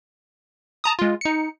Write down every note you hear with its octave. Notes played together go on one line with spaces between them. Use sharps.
A5 A#5 D#6
G#3 F4
D#4 C#7